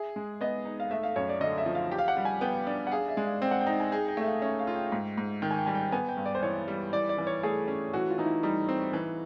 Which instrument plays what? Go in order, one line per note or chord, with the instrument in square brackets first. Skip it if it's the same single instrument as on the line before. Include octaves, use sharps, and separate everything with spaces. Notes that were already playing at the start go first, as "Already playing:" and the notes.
Already playing: [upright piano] G#4 [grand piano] E5
[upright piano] G#3
[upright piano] B3 [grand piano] D#5
[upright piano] D#4
[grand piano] F5
[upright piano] A3 [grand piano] E5
[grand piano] F5
[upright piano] F#2 [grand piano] C#5
[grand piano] D5
[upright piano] D3 [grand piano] D#5
[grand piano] E5
[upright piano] F3
[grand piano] F5
[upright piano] G4
[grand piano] F5
F#5
[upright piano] G3
[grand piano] G#5
[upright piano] B3 [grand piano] G5
[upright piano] D4
[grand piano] F#5
[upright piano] G#4 [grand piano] F5
[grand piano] E5
[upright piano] G#3
[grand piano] F5
[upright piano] C4 [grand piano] G5
[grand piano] F#5
G5
[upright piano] D#4
[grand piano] G#5
[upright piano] G#4 [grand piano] G5
[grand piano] G5
[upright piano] A3 [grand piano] E5
[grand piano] F5
[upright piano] C#4 [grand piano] E5
[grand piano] F5
[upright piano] F4
[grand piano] G5
[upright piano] G#2
G#2
[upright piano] D#3 [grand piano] G5
[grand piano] G#5
G5
[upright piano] G3 [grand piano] G#5
[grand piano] G5
[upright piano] B3 [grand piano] G#5
[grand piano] G5
[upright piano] G2
[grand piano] D5
C5
[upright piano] E3 [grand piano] C#5
[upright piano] G3
[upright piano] E3 [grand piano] D5
[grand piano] D5
[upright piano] E3
[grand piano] C#5
[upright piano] A3 [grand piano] G#4
[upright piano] C#4
[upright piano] E3 [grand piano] F#4
[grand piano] F4
[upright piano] E3 [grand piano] D#4
[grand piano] E4
[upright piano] G3 [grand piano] D#4
[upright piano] C4
E3